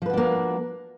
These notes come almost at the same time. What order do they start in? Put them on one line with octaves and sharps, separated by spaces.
F3 B4 F#4 D4 A#3